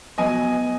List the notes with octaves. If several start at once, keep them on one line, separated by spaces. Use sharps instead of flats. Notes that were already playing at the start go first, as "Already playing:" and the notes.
B2 F#3 B3 D#5 G#5